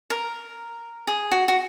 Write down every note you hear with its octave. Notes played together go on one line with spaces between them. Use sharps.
A#4
G#4
F#4
F#4